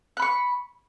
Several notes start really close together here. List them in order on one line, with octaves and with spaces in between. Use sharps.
F#6 B5 C#6